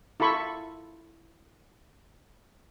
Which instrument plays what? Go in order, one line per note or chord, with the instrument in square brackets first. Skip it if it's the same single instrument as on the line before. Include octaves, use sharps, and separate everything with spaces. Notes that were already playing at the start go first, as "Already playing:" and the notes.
[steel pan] E4 F4 A4 B5 C#6